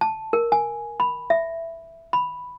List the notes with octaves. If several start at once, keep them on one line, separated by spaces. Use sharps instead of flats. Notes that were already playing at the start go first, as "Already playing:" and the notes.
A5
A#4
G#5
B5
E5
B5